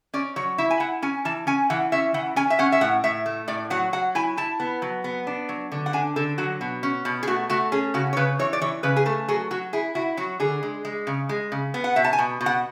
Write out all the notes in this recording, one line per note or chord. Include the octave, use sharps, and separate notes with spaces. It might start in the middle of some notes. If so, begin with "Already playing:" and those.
C#4 D5
F#3 C#5
E4 E5
G#5
E4 F#5
C#4 G#5
E3 A5
C#4 G#5
E3 F#5
C#4 E5
E3 F#5
C#4 G#5
E5
C#4 F#5
E5
A2 F#5
A2 E5
A3
A2 D5
F#3 F#5
F#3 F#5
E4 G#5
E4 A5
B3
F#3
B3
D4
F#3
D3
F#5
D4 G#5
D3 A4
F#3 F#4
B2
C#4
B2
G#4
A3 F#4
A3 F#4
C#4 G#4
C#3 F#4
C#5
C#3 B4
E3 C#5
D5
E3 C#5
C#3 B4
G#4
A3 A4
F#3 G#4
F#3 F#4
E4 G#4
E4 F#4
F#3 F#4
D3 G#4
G#3
G#3
C#3
G#3
C#3
B3
F#5
B2 E5
A5
G#5
B2
B2
F#5